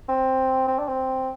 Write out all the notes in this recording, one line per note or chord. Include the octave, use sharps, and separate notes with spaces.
C4
C4
D4
C4